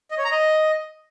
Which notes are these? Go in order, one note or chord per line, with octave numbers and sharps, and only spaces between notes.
D#5
C#5
A#5
D#5